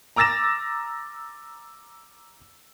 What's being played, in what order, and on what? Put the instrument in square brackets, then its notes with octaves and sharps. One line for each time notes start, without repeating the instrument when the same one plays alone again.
[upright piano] A#5 D6 E6 A6 A#6 E7